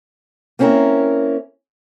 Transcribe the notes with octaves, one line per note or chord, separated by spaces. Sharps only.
A#3 C4 C#4 E4 A#4